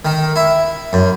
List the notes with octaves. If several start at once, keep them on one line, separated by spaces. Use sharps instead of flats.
D#3
E4
F#2